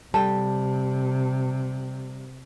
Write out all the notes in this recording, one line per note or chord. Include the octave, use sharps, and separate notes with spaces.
C3 G3 A4 G5 A5